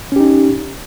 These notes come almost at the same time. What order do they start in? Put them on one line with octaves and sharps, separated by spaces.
C#4 G4 D#4